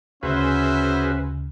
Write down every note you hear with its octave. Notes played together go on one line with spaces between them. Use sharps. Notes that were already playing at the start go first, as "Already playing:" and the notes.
D2 C#3 C#4 F#4 G#4 B4 C5 E5